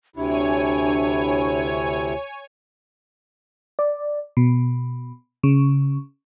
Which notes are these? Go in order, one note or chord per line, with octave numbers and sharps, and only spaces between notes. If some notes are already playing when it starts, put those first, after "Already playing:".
D2 C3 D4 E4 C#5 G#5
D5
B2
C#3